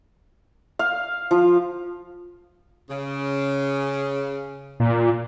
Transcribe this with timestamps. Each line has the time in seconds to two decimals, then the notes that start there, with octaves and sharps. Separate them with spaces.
0.79 F5
1.31 F3
2.90 C#3
4.80 A#2